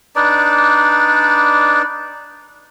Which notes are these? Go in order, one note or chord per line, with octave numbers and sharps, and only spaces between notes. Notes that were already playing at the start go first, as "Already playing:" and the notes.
D4 D#4 B4 D5